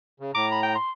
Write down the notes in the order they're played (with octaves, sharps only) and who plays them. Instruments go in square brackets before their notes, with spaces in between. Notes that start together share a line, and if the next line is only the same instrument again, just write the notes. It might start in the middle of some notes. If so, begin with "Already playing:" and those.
[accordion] C#3
[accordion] A2 A#5 [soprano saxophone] D6
[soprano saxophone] B5
G5
C6